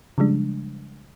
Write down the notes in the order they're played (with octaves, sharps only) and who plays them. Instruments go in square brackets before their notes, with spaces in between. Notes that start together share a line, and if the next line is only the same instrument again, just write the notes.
[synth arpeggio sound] C#3 F3 G3 G#3 D4